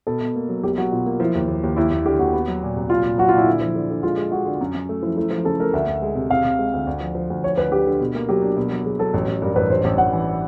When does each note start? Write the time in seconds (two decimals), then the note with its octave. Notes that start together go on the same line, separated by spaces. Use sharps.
0.07 B2 A4
0.21 B2
0.35 A#3
0.49 F#3
0.63 B1 G4
0.77 F#3 F#4
0.92 B2 F4
1.06 A#3
1.20 F3 E4
1.35 D#2
1.48 D#2
1.63 D#2
1.76 D#2 E4
1.90 D#2
2.06 D3 G4
2.19 D#2 F#4
2.33 B3
2.48 F#3
2.62 A#2
2.77 C2
2.90 A#2 F4
3.05 A#2
3.18 F#3 F#4
3.29 F4
3.33 A#2 E4
3.47 D3
3.61 F3
3.75 D3
3.90 D3
4.03 G#3 F4
4.17 G#3
4.31 G#3 F#4
4.46 D3
4.61 F#2
4.74 F#2
4.89 A3
5.02 F3 E4
5.16 A3 E4
5.30 F3
5.45 C#3 A4
5.60 A3 A#4
5.73 D2 E5
5.87 D2
6.02 G#3
6.15 C3
6.30 C3 F5
6.44 C3
6.59 G#3
6.73 D2
6.87 D2
7.00 F3
7.15 F3
7.30 D2
7.43 F3 C#5
7.57 D2 B4
7.72 D3 G4
7.86 D3
8.00 B2
8.15 A#3
8.29 F#3 G4
8.42 D4
8.56 B2
8.71 F#3
8.85 F#3 G#4
8.99 F#3 A4
9.14 A1
9.27 A1
9.42 G2 A#4
9.56 A1 B4
9.70 A1 C5
9.84 A1
9.98 A1 F#5
10.12 E3